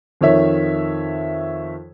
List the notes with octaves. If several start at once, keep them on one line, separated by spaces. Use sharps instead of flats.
F2 D#3 C#5 E5